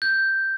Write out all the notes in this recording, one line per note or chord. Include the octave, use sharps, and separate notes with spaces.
G6